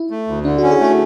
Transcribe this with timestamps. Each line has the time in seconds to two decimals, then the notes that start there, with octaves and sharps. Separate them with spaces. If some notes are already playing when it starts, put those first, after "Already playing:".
Already playing: E4
0.11 A3
0.28 D2
0.45 D3 D4
0.58 C#4 F#4
0.71 G#4
0.80 A3 F#4